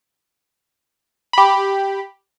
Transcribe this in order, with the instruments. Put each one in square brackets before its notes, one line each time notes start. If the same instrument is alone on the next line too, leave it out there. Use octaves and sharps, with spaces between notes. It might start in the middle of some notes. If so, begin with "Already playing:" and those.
[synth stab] G4 B5